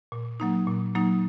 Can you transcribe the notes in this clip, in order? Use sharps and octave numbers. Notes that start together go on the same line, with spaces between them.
A#2
F#3 A#3 D#4
A#2
F#3 A#3 D#4